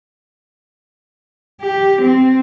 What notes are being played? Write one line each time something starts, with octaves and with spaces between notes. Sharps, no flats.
G4
C4